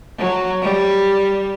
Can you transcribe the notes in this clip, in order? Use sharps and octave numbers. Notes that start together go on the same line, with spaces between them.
F#3
G3